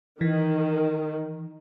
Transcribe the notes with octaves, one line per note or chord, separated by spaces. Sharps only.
D#3 E3